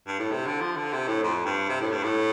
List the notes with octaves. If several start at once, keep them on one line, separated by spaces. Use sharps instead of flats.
G2
A2
C3
D3
F3
D3
C3
A2
F2
G2
C3
A2
G2
A2